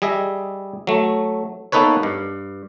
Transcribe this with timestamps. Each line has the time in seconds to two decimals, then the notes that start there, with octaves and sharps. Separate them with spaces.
0.02 G3 G#4 D#5 E5
0.87 F#3 A3
1.72 A#3 B3 D#4 A4 B4 C#5
2.03 G2